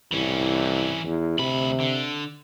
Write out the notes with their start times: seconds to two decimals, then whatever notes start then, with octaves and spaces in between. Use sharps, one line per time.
0.12 C2 E3 C#4
1.04 E2
1.39 D2 C3 B5
1.80 D3